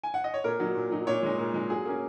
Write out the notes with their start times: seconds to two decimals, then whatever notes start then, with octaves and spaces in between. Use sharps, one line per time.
0.04 G#5
0.14 F#5
0.24 D#5
0.34 C#5
0.44 A#2 A#4
0.60 F#3 D#4
0.75 A#2
0.91 F#3 D#4
1.07 A#2 C#5
1.23 G#3 D#4
1.38 A#2
1.54 G#3 D#4
1.70 F#3 G#4
1.85 A#3 C#4